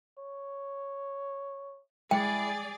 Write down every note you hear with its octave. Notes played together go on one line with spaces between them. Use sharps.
C#5
G#3 E4 G#4 D5 G5